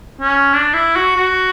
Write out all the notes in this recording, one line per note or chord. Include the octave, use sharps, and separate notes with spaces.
C#4
D4
E4
F#4
F#4